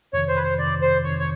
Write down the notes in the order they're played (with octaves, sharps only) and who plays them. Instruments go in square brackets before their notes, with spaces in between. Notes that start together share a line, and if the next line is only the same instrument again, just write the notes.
[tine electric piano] F2 C3 D#3 [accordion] C#5
[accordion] C5
B4
C5
[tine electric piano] F2 C3 D#3 [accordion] D5
[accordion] C5
[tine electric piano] F2 C3 D#3 [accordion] C#5
[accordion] C#5